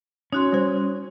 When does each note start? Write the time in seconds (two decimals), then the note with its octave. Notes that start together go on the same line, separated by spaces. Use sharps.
0.33 C#4 D#4 F#4 C6
0.52 G3 C5